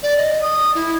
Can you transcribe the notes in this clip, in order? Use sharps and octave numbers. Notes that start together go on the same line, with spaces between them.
D5
D#5
D#6
E4